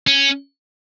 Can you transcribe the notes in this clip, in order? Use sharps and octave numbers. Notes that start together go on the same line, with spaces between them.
C#4